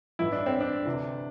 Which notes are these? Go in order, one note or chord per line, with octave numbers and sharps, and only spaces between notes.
A1 G2 E3 E4
D4
C4
D4
D2 C3 E3